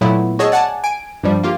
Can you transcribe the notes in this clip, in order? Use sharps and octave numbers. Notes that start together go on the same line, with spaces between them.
A#2 F#3 A3 B3 E4
F#4 G#4 C#5 D#5 A5 E6
D5 F#5 G#5 A5
G#5 D7
G2 F3 G3
A#3 F4 G4